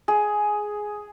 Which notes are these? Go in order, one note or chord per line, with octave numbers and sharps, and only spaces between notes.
G#4